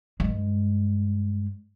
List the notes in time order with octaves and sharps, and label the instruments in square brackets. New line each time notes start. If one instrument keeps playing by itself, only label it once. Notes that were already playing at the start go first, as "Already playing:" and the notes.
[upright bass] G2 G#3